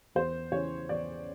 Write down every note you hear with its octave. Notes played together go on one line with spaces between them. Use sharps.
E2 C5
C#3 E3 C#5
E2 D5